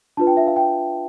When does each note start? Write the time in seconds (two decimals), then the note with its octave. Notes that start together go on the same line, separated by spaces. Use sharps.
0.17 D4 F4 B4 A5
0.27 G5
0.37 E5
0.47 F5
0.56 G5